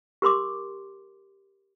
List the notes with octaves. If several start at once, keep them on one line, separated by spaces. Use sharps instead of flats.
G4 A#4 C6 D6